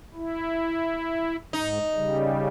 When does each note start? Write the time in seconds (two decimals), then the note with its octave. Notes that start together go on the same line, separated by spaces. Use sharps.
0.15 E4
1.53 G#2 D#4
1.93 C#3 G3